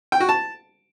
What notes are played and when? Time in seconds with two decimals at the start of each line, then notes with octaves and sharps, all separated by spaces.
0.12 G5
0.20 F#4
0.29 A5